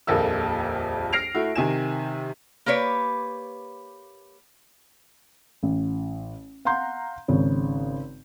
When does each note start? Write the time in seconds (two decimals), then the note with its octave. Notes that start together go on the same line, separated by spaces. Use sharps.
0.07 D#1 A#1 F2 A#3 A4 E6
1.13 F6 A#6 C7 D7 F7
1.35 A3 E4 F#4
1.55 C3 D#3 G#5 E7
2.66 A#3 G4 B4 C#5 D5
5.63 A1
6.65 F5 F#5 A#5 C6 G6
7.28 G#1 C#3 C#5